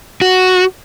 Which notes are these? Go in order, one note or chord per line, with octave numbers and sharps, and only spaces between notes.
F#4